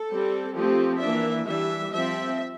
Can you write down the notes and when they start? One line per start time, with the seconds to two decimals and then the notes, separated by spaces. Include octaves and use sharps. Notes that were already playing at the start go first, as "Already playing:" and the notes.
Already playing: A4
0.09 G3 C4
0.54 F3 A3 C4 G4
1.00 E3 A#3 D4 E5
1.45 E3 G3 D4 E5
1.92 F3 C4 E5